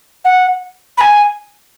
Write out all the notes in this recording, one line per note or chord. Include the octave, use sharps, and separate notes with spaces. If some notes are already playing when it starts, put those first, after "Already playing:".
F#5
B5
G#5